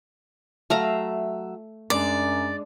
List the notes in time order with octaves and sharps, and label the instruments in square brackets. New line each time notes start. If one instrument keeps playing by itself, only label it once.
[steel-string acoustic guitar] F#3 E5 [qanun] A3 F5 A#5
[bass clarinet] F#2 [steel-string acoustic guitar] G#3 D4 [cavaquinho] D5